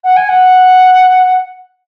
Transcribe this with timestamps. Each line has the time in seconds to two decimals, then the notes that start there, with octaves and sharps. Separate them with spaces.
0.04 F#5
0.17 G#5
0.29 F#5